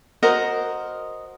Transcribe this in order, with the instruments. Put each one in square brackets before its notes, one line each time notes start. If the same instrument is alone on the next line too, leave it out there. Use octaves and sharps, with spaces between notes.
[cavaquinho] F#4 A#4 C5 D#5